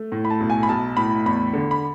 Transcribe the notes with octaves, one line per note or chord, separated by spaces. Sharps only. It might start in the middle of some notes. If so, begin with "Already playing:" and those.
Already playing: A3
A2
B5
A5
B1
G#5
B5
B1 A5
A2 B5
E2 B5
D3
B5